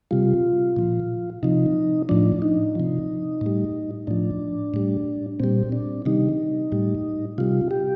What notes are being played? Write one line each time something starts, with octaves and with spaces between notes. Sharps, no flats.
C3 G3 F4
A#2 F3
C3 F3 D#4
A2 F3 D4
D#4
C3 F3
A2 G3
A2 F3 D4
A2 G3
A#2 G3 C4
D4
C3 D#3 G3 D#4
A2 G3
C3 G3 F4
G4